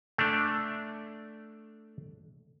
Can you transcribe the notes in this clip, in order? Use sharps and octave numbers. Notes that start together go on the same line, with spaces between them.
A3 D4